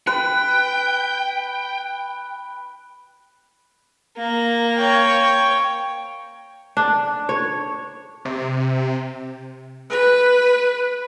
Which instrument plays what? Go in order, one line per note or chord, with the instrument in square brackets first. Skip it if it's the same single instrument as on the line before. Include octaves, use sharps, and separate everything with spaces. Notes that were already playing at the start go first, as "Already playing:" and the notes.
[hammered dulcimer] B4 [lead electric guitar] G5
[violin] A#3 A#5
[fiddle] C#5 G5
[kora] D4
C#5
[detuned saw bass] C3
[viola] B4